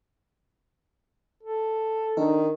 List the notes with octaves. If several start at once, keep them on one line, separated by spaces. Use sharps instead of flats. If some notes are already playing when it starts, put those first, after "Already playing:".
A4
D#3 D4 D#4 A#4